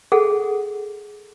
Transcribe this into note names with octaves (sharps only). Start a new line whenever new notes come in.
G#4 A4 F#5